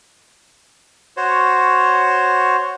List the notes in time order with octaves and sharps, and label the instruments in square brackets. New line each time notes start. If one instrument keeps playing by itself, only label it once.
[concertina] F#4 C5 C#5